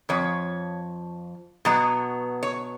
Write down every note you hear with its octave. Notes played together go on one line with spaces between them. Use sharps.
F2 F3 C#5
B2 F#3 B3
C#5